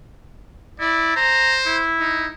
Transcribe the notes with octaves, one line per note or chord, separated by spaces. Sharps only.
E4 D5
C5 A#5
E4
D#4